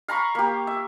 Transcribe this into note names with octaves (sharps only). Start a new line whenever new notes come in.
F5 A#5 B5 C#6
A#3 G4
E5